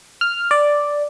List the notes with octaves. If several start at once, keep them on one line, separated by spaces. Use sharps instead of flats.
F6
D5